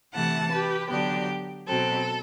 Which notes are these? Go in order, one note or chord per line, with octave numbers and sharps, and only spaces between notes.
C3 E3 A3 F#5 A5
G4 B4
D3 F#3 B3 D4 G4
B2 F#3 C4 A4